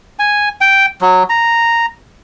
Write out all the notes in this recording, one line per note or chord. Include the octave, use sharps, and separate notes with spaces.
G#5
G5
F#3
A#5